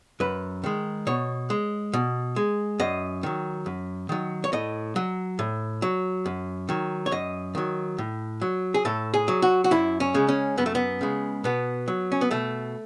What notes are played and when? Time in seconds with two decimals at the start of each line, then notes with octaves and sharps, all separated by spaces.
0.20 F#2 B4
0.64 D#3 G#3
1.07 B2 C#5
1.50 G#3
1.93 B2
2.36 G#3
2.80 F#2 D#5
3.23 D#3 F#3
3.66 F#2
4.09 D#3 F#3
4.44 C#5
4.53 A2 D#5
4.96 F#3
5.39 A2
5.82 F#3
6.26 F#2
6.69 D#3 F#3
7.06 C#5
7.12 F#2 D#5
7.55 D#3 F#3
7.98 A2
8.42 F#3
8.74 G#4
8.85 A2 A4
9.14 G#4
9.28 F#3
9.42 F#4
9.64 F#4
9.71 F#2 E4
10.00 C#4
10.14 C#3 G#3
10.29 C#4
10.58 F#2 B3
10.66 A3
10.75 B3
11.01 C#3 G#3
11.44 B2 B3
11.88 F#3
12.12 C#4
12.21 B3
12.31 B2 A3